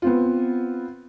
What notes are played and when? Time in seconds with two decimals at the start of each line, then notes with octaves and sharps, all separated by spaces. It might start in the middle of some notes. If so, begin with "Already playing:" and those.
0.02 B3 C4 F4